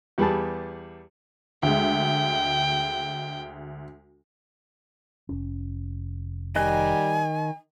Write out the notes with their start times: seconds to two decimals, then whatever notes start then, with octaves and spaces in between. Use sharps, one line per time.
0.18 E2 G3 B3 G#4 A5
1.63 D2 G#3 G5
5.29 F1 C#4
6.56 D#3 G3 D#5 G#5 F#6